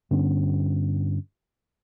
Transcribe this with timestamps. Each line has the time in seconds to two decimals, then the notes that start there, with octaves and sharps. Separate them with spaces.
0.11 G2 D3 B3 C#4